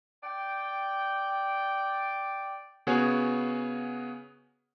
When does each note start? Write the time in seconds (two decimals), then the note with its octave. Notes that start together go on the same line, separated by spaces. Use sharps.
0.23 D5 G5
2.87 C#3 B3 F#4 G#4 C#5